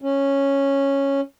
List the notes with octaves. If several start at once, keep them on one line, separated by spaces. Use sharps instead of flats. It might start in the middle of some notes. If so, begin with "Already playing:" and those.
C#4